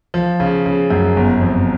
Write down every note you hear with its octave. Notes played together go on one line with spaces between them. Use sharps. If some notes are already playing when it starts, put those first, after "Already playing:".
F3
C#3
C#3
F#2
G1
F2